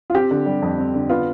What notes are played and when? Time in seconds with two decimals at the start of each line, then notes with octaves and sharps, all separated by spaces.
0.10 F4
0.15 C4 G4
0.31 D3
0.46 G3
0.62 F2
0.78 C4
0.94 D3
1.09 B3 F4